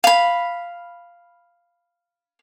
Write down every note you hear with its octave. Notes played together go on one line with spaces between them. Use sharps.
F5 B5